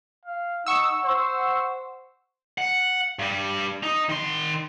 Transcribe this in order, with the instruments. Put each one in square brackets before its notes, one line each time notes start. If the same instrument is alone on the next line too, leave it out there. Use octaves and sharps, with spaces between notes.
[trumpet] F5
[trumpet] D#4 [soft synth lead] F#5 [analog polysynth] C#6 E6
[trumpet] C5
[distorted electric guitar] F#5
G2 G3
D#4
D#3 C6